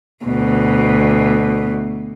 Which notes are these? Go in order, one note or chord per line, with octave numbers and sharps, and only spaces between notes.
D2 B2